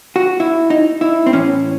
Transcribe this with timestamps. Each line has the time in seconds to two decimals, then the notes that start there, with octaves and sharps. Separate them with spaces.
0.16 F#4
0.40 E4
0.70 D#4
1.01 E4
1.26 C4
1.33 A2 E3 C#4